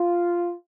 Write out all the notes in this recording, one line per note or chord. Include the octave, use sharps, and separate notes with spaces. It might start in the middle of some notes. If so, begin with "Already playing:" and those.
Already playing: F4